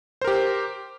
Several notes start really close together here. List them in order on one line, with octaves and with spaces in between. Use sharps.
C5 A#4 G4